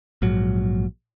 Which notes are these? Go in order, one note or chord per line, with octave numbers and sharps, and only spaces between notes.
A#1 G#2 F#3